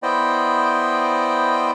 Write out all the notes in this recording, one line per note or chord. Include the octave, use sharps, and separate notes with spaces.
B3 E4 C5 D5 D#5 G5